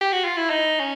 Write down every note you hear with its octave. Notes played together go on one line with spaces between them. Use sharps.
G4
F#4
F4
E4
D#4
C#4